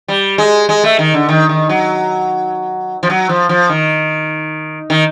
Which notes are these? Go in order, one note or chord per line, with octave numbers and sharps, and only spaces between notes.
G3
G#3
G#3
A3
D#3
D3
D#3
D#3
F#3
F3
F#3
F3
F3
D#3
D#3